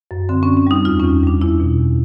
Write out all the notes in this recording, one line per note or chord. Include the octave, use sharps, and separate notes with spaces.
F#2
D3 C4
D3 C#4
C#4
G3 D#4
E2 F4
E2 C#4
G3 D4
E2 E4
B2
E2